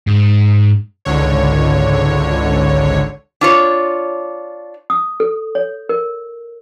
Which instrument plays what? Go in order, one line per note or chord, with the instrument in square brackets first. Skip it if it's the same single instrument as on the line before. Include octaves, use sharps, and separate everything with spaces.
[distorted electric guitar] G#2
[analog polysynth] G#1 C#2 D3 C#5
[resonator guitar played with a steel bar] D4 F4 C#5
[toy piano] D#6
A4
C#5
A#4